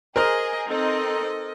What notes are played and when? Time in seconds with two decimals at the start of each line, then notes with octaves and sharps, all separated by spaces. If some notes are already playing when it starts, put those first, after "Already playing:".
0.16 G#4 A#4 C5 D#5 F6
0.68 C4 D#4 A4 D#5